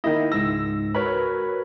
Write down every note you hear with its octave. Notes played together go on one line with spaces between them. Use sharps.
D#3 A#3 E4 D#5
C#2 G#2 E6 A#6
F#4 A#4 B4 C#5 B5